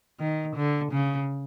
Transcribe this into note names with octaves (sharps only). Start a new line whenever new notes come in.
D#3
D3
C#3